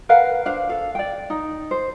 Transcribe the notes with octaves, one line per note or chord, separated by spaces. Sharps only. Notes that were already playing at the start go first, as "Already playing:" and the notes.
A#4 B4 F5 F#5
D4 C5 F5
A4 F5
D5 G5
D#4
C5